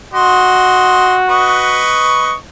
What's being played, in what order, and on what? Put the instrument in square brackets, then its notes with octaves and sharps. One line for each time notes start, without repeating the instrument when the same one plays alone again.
[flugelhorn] F#4 [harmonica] D#5 C6
[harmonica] B4 D#5 C#6